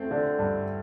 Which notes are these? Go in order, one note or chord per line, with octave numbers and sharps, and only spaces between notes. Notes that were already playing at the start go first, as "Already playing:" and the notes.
Already playing: A3 C4
D3
G2